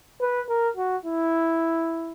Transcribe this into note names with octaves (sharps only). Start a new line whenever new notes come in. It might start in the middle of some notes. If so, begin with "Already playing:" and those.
B4
A#4
F#4
E4